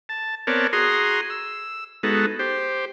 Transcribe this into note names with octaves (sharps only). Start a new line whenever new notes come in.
A5
B3 C4 A#4 C#5 D5 A5
F#4 G#4 A#5 C6 D#6
E6
G#3 B3 D#4 F#4 A4
G4 C5